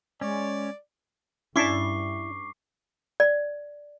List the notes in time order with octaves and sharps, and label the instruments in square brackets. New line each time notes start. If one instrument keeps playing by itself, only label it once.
[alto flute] G#3 [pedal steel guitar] C#4 C#5 [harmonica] D5
[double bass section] G2 [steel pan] C#4 D4 A5 [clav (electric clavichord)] E4 [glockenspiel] C#6 D6 C7
[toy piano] D5